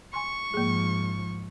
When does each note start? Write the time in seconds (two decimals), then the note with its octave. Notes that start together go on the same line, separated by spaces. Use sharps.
0.14 G#5 C6 C#6
0.54 G#2 F3 A#3 G#4